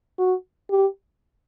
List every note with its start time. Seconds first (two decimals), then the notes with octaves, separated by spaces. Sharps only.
0.18 F#4
0.70 G4